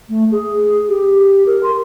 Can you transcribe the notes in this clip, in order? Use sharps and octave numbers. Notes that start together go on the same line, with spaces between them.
A3
G#4
G4
A#4
C6